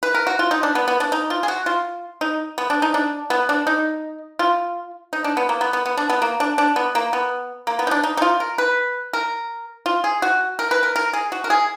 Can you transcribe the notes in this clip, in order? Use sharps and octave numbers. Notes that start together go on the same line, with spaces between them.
B4
A#4
F#4
F4
D#4
D4
B3
B3
D4
D#4
F4
G#4
F#4
F4
D#4
B3
D4
D#4
D4
B3
D4
D#4
F4
D#4
D4
B3
A#3
B3
B3
B3
D4
B3
A#3
D4
D4
B3
A#3
B3
A#3
B3
D#4
D4
D#4
D#4
F4
A#4
B4
A#4
F4
G#4
F#4
A#4
B4
A#4
A#4
G#4
F#4
A#4
G#4